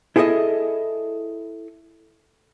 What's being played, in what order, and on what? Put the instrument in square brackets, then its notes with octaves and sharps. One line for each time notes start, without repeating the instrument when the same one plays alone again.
[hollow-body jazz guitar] E4 G#4 A4 C5 D#5 E5